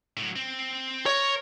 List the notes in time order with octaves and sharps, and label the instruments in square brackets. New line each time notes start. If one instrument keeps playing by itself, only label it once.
[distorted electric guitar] A2 F#3
C4
[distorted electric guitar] A#4 [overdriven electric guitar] C#5